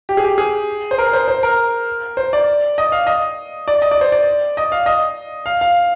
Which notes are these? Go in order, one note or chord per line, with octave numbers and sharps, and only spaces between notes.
G4
G#4
G4
G#4
C5
A#4
C5
C5
A#4
C5
D5
D#5
F5
D#5
D5
D#5
D5
C5
D5
D#5
F5
D#5
F5
F5